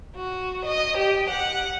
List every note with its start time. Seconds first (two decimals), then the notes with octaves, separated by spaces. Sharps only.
0.16 F#4
0.66 D#5
0.98 G4
1.30 F#5